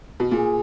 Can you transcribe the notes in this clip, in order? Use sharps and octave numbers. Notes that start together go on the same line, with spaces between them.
B2
A#2 G#4